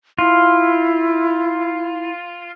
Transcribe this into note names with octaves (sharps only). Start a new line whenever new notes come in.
E4 F4